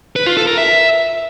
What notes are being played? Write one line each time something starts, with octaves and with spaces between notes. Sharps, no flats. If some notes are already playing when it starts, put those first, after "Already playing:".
B4
F4
A4
A#4
E5